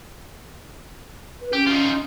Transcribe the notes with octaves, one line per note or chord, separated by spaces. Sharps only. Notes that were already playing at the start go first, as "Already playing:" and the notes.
B4
C#4 G4
D#4 F4